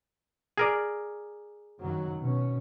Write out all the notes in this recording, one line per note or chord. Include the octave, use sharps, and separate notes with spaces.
G#4 A#4 D5
F#2 D#3 F#3
B2 C#4